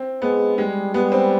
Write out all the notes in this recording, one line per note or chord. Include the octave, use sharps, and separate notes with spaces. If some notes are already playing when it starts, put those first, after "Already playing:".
Already playing: C4
G#3 B3
G3 G#3
G3 B3
C4